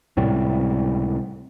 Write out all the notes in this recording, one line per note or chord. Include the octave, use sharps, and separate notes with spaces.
C#2 A2 C3 G3